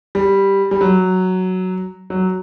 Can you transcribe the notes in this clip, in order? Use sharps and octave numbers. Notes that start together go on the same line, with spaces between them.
G3
G3
F#3
F#3